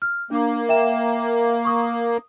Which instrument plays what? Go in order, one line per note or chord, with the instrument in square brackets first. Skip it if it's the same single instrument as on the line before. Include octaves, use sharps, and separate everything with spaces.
[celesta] F6
[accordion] A#3 [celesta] D4 D6
[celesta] E5 G5 E7
C#6 D#6
D#6